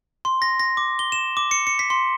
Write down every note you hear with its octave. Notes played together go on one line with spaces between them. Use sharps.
C6
A#6
A#6
D6
G7
E7
D6
C#7
C#7
B6
C6